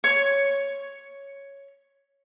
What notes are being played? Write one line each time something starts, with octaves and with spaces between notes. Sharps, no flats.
C#5 C#6